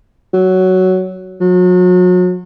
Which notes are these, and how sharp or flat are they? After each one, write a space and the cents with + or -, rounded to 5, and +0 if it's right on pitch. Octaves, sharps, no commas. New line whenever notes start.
F#3 +10
F#3 -35